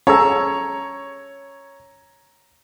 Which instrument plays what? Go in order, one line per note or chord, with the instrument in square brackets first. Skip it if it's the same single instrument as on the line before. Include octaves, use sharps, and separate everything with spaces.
[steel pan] C#4 G#4 A4 [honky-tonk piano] C#5 [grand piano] A#5 E6